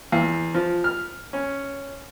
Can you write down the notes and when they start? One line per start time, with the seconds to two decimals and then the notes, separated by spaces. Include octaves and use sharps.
0.12 E2
0.55 F3
0.84 F6
1.33 C#4